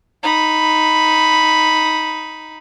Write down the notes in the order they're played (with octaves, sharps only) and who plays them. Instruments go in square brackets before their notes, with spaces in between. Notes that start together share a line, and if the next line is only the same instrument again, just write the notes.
[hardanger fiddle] D#4 B5